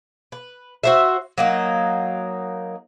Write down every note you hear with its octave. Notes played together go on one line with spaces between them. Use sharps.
B4
F#4 C5 E5
F#3 A#3 D#4